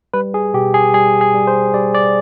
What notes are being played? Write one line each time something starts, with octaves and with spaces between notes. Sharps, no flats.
G3 B4
G#4
B2 G4
G#4
G3 G#4
G#4
G3
C5
G3 D5
D5